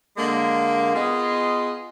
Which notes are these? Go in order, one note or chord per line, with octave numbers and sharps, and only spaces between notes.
D3 G#3 A#3
B3 F4 G#4 D#5